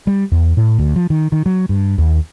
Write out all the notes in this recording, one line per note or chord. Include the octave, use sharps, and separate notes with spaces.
G3
E2
A2
D2
F3
D#3
D#3
F#3
G2
D#2